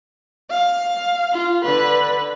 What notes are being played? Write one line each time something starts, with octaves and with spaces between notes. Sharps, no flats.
F5
F4
D3 B4